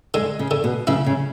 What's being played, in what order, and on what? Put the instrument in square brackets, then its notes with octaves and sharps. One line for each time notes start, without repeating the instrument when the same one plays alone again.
[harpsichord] D3 [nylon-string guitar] G#3
[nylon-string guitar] C#3
[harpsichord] D3
[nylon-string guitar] B2
[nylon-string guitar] C#3 [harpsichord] E4
[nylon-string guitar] C#3